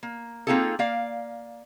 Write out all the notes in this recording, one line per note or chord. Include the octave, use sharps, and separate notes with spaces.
A#3
A#3 C4 D#4 F4 G#4 A4
A#3 D5 F5